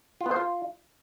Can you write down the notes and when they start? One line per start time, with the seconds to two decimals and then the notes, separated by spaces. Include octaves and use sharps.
0.21 F4
0.26 B3
0.31 C5
0.36 F4